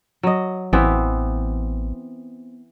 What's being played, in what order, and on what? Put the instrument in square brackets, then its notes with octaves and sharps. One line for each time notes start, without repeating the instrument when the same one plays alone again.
[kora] F#3 D#5
[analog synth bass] A1 [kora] E3 B3 C4